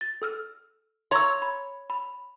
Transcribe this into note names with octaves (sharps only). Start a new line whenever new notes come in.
A6
A4 E6 F6
C#5 A#5 C6 C#6 E6
B5
B5